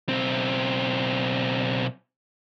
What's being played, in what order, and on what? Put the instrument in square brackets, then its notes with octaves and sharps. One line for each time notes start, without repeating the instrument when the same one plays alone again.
[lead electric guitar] B1 C4